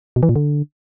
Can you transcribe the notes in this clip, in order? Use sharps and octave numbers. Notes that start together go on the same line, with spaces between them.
B2
E3
A#2
D3